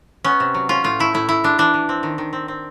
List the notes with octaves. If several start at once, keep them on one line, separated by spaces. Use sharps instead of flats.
B3 C#4
C3
F#3
C#4 F4
A2 F4
A3 E4
A2 E4
A2 E4
G#3 D4
E3 D4
E3
C4
D#3
D#3
C4
C4